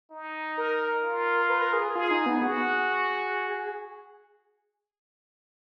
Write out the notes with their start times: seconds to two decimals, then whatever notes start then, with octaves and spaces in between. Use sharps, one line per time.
0.11 D#4
0.57 A#4
1.03 F4
1.49 B4
1.61 A#4
1.73 G#4
1.84 G#4
1.96 F4 G#4
2.11 D#4
2.26 B3
2.42 F#4 G#4